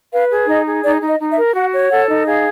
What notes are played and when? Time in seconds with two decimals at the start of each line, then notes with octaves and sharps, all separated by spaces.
0.13 B4 F5
0.31 G#4
0.48 D#4 D#5
0.66 G#4
0.84 D#4 D5
1.01 D#4
1.08 D#5
1.20 D#4
1.31 E5
1.37 A#4
1.55 F#4 F#5
1.73 C#5
1.91 A4 F#5
2.09 D#4
2.26 G#4 F5